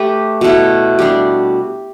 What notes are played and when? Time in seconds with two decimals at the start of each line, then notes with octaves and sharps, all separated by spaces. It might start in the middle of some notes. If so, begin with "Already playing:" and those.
Already playing: A3 G4 B4
0.41 B2 A3 E4
0.99 G3 D4 G4